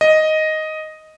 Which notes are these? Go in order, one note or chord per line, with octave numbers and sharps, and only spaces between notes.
D#5